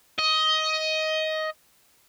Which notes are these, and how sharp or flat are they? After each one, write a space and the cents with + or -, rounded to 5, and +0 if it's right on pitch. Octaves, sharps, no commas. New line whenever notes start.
D#5 +15